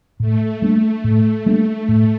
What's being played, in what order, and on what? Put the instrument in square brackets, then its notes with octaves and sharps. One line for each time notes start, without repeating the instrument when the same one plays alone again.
[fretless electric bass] A2 [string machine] A3
[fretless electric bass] G3 A#3 D4
A2
G3 A#3 D4
A2